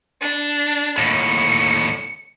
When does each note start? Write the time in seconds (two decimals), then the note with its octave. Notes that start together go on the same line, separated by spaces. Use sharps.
0.21 D4
0.98 D#2 A2 C#7